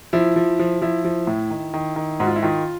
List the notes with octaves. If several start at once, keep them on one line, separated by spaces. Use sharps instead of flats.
F3 E4
F3
F3
F3 E4
F3
A2
D#3
D#3
D#3
G#2 F#4
F4
E4
D#3 F4